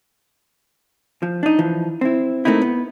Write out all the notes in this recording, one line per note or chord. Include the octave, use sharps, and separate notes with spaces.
F3
D4 D#4
E3 F3
C4 E4
A3 A#3 C4 D#4 E4
B3